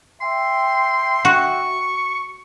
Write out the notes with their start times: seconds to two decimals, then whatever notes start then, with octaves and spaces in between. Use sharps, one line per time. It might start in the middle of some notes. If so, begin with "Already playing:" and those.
0.21 E5 G5 C6
1.25 F#4 C#6